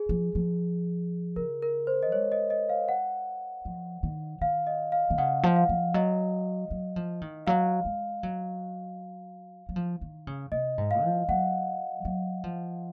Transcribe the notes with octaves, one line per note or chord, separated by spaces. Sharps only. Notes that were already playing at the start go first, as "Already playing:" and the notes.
Already playing: G#4
F3
F3
C#3 A#4
A#4
C5
D#5
G#3 C#5
D#5
D#5
F5
F#5
F3
D#3
D#3 F5
D#5
F5
D#3
C#3 F#5
F3
F5
F3
F#3 D#5
F#3
F3
D#3
F#3 F5
G#3
F#3
F#3
F3
D#3
C#3
C3 D#5
G#2
F5
F3
F#3 F#5
F#3
F3